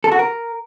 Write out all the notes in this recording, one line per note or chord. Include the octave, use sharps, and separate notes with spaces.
A4
F#4
A#4